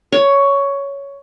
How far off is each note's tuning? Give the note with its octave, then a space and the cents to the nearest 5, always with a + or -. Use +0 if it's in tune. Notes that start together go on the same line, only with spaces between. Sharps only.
C#5 +10